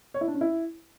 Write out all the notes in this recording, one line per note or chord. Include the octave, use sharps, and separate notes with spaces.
C#5
E4
D4
C#4
E4